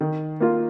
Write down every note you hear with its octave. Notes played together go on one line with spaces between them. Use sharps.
D#3
A#3 F4